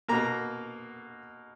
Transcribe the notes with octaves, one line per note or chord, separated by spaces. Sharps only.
B2 A#3 A#5